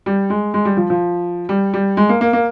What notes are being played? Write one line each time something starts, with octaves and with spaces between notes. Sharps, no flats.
G3
G#3
G#3
G3
F3
F3
G3
G3
G#3
A#3
A#3
A#3